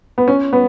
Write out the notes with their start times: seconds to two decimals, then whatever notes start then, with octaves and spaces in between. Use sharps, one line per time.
0.18 B3
0.28 C#4
0.53 B3